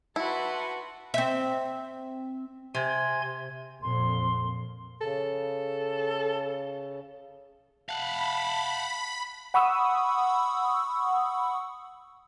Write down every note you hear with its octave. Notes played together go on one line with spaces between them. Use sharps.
E4 F#4 B4 A5 C6
C4 E5
C3 G#5 C6 G#6
F2 A#2 C6
C#3 A4
F5 F#5 A5 B5
F#5 B5 C#6 D#6 E6